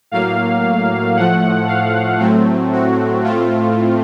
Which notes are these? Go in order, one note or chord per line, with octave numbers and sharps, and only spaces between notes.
A2 F#3 A#3 F5
A2 F3 A3 F#5
F5
A2 F#3 A3 C4
F#4
A2 A3 C4 F4